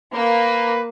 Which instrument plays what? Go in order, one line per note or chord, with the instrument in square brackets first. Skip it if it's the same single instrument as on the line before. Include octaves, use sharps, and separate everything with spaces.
[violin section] A#3 [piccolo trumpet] B4